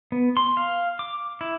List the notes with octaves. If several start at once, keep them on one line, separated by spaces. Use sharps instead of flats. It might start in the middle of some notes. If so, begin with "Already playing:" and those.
B3
C6
F5
D6
E4